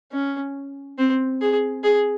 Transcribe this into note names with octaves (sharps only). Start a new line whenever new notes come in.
C#4
C4
G#4
G#4